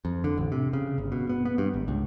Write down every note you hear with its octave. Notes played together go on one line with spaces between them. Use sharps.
F2
D3
A1
C3
C#3
G1
B2
B3
B3
G2
G#1
C#2